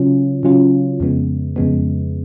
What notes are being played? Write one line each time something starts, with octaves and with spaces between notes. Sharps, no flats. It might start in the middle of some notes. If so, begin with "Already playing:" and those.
Already playing: C#3 F#3 C#4 F4
C#3 F#3 C#4 F4
F2 C#3 G#3 B3
F2 C#3 G#3 B3